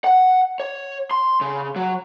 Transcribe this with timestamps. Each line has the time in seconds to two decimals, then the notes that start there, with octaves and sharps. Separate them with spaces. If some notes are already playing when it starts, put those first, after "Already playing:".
0.04 F#5
0.60 C#5
1.11 C6
1.41 C#3
1.76 F#3